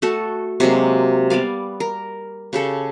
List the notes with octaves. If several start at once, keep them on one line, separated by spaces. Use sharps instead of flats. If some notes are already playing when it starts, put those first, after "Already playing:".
A3 F#4 A4
C3 F#3 G#3 A#3
G3 B3 D5 F5
A#4
C#3 G4 A4